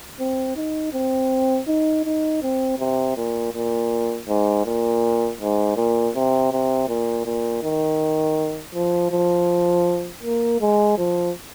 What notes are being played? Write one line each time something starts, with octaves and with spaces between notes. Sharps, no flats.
C4
D#4
C4
D#4
D#4
C4
C3
A#2
A#2
G#2
A#2
G#2
A#2
C3
C3
A#2
A#2
D#3
F3
F3
A#3
G#3
F3